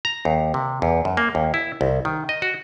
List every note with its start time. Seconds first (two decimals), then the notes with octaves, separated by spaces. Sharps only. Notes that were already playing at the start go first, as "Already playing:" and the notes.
0.05 A#5
0.25 D#2
0.54 C3
0.82 E2
1.05 F#2
1.17 A#3
1.35 D#2
1.54 E4
1.81 C2
2.05 D#3
2.29 D#5
2.42 F#4